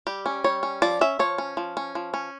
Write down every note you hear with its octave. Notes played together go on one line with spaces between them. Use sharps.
G3 G4
C#4
G3 C#5
C#4
F3 D5
C#4 E5
F3 C#5
C#4
F3
C#4
F3
C#4